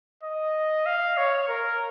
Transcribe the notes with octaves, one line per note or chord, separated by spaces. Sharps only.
D#5
F5
C#5
A#4